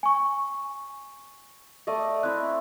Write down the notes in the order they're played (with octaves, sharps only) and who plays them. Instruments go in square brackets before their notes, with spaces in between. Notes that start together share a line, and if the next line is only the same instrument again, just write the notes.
[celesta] G#5 C#6
[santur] A3 D5 D#5
[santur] C4 E4 [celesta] F#6